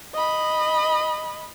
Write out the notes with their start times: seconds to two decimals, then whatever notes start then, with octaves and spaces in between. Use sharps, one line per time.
0.14 D#5 B5